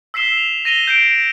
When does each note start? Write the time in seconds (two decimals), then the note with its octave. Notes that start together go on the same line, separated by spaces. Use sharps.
0.14 E6 B6 C7 E7 G7
0.37 F7
0.65 A#6 D#7 F7 G7
0.87 G6 C7 D7
1.03 D7